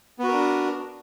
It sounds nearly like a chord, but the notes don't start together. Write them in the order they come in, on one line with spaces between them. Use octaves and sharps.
B3 F#4 A#4 D4